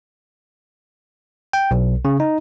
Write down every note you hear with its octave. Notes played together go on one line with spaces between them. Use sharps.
G5
B1
C#3
D#4